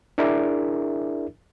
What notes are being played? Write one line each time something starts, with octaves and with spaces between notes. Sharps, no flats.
D4 E4 G#4 A#4 D5 E5